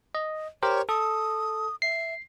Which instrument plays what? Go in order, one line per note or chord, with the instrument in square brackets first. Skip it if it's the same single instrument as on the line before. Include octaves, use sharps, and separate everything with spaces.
[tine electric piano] D#5
[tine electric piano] G4 A#4 C5 [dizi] C#5
[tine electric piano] A4 [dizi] D#6
[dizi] E5 [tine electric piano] C7